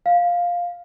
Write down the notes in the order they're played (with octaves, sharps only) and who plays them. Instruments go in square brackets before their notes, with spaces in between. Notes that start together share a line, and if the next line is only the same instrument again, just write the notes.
[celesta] F5